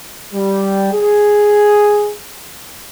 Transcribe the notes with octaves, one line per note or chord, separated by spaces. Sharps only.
G3
G#4